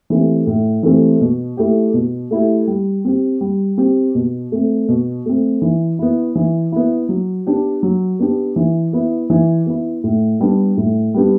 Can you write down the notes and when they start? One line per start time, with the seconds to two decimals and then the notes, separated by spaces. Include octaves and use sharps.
0.10 E3 A3 C4 G4
0.47 A2
0.83 E3 A3 C4 G4
1.21 B2
1.57 A3 E4 G4
1.94 B2
2.31 A3 E4 G4
2.67 G3
3.05 C4 G4
3.41 G3
3.78 C4 G4
4.15 B2
4.52 A3 C4
4.89 B2
5.26 A3 C4
5.62 E3
5.99 B3 E4
6.35 E3
6.72 B3 E4
7.09 F#3
7.47 B3 D4 G4
7.83 F#3
8.19 B3 D4 G4
8.56 E3
8.93 B3 E4
9.30 E3
9.66 B3 E4
10.04 A2
10.40 G3 B3 D4 G4
10.77 A2
11.14 G3 B3 D4 G4